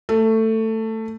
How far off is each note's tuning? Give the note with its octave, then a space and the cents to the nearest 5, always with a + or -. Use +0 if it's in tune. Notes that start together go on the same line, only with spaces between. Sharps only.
A3 +15